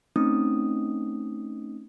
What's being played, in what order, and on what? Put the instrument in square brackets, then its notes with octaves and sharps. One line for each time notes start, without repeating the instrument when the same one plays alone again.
[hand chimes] A3 C4 C#4 D#4 D#6